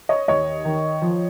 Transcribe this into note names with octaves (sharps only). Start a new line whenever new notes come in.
C#5 D#5
D#2 C#5 D#5
D#3
F3